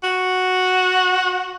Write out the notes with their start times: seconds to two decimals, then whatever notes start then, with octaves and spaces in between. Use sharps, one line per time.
0.03 F#4